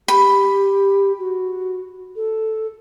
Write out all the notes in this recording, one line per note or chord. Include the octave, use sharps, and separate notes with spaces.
G4 B5
F#4
A4